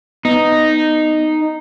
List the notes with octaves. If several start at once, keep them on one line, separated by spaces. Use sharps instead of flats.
B3 D#4